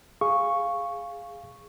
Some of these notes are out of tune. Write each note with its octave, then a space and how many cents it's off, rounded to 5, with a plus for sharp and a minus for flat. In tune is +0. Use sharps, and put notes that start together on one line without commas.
G#4 +0 F5 +0 C#6 +0